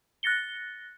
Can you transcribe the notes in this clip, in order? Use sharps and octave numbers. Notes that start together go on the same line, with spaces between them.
F#6 A6 A#6 C#7 G7